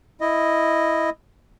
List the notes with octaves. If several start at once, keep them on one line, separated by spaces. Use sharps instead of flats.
E4 D#5